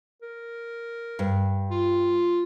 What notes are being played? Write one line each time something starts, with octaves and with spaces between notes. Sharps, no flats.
A#4
G2
F4